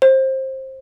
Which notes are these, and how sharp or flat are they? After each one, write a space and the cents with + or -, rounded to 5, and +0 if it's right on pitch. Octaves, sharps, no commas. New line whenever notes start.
C5 +20